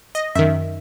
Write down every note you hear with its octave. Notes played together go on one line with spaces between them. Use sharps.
D#5
F#2 D#3 E5